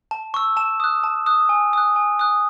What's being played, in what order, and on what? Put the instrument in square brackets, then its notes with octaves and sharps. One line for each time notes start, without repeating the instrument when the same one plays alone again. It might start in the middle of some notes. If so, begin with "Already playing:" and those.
[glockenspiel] A5
C#6 E6
A5 E7
D#6 F#6
A5
D#6 F#6
G#5
D#6 F#6
G#5
D#6 F#6